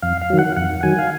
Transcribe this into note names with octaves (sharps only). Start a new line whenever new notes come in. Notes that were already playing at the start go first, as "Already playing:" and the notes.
F2 F5
F5
D#3 F#3
F#5
F2 F#5
D#3 F#3 G#5
F5